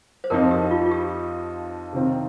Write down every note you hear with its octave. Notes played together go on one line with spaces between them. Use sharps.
C5
F2 F3 C4 D#4 A#4
G4
F4
F4
G4
C3 D#3 C4 F4